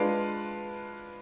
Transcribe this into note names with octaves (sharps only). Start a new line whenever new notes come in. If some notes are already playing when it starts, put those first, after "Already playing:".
Already playing: G#3 D4 F4 B4